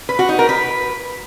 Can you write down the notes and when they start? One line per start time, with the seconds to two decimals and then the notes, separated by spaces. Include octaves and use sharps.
0.09 B4
0.19 F#4
0.29 D#4
0.39 A#4
0.49 B4